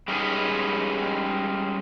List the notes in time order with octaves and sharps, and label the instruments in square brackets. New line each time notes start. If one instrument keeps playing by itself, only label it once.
[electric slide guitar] G3 G#3 C#4 D#4 G#4 B4